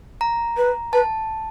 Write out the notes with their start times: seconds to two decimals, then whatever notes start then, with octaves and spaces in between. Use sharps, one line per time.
0.21 A#5
0.57 B4
0.93 B4 A5